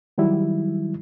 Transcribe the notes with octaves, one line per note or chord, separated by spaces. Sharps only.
D#3 F#3 G3 E4